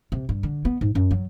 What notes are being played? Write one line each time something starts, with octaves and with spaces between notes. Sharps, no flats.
C3
G2
D3
B3
G#2
F#2
F#3